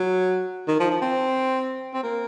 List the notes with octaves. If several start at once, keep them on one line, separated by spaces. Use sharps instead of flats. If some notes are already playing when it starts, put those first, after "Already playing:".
Already playing: F#3
D#3
F3
F3
C4
C4
A#3